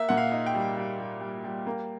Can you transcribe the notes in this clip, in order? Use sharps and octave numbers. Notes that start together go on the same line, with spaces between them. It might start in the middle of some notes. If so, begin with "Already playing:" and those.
Already playing: A#3 E5
A#2 F#5
F5
D#4
G5
G3
G3
G3
G3
G3
A#3